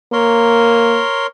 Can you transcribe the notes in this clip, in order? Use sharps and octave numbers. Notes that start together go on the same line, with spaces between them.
A#3 A#4 C#5 C6